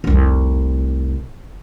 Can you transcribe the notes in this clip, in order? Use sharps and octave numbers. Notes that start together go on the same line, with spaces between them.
F1 C2